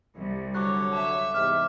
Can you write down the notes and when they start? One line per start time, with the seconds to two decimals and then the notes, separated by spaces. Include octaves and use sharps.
0.14 C2
0.55 D3 F#3 C#5 D6 F#6
0.93 E5 A5 D6
1.34 E2 G#2 C3 D6 F6